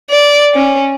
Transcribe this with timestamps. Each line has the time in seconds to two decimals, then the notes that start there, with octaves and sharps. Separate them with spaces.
0.10 D5
0.54 C#4